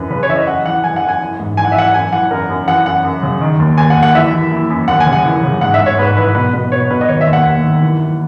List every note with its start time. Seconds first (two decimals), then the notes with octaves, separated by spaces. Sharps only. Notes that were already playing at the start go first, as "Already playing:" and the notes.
Already playing: F#2 E3 B4
0.10 C#3 B4
0.23 C#5
0.29 E3 E5
0.36 D#5
0.47 F#2 F#5
0.66 E3 F#5
0.84 E3 G#5
0.96 F#5
1.03 F#2
1.09 G#5
1.21 E3
1.40 G#2
1.57 E3 G#5
1.65 F#5
1.72 E5
1.76 E3 F#5
1.94 F#2 G#5
2.13 E3 F#5
2.31 F#2 A#4
2.49 F#2
2.68 E3 F#5
2.86 F#2 F#5
3.04 F#2
3.23 C#3
3.41 D#3
3.60 D#2
3.78 D#2 G#5
3.90 F#5
3.96 D#2
4.03 F#5
4.15 E3 E5
4.32 E3
4.51 E3
4.70 F#2
4.88 D#2 F#5
5.00 G#5
5.07 C#3
5.13 F#5
5.25 E3
5.43 C#3
5.61 G#2 F#5
5.74 E5
5.80 G#2
5.86 C#5
5.98 G#2 B4
6.17 E3 B4
6.35 B2 B4
6.53 B2 B4
6.72 B2 C#5
6.90 B2 B4
7.01 D#5
7.08 D#3 C#5
7.21 E5
7.27 D#2
7.33 F#5
7.45 D#2
7.64 D#3
7.82 E3
8.01 E3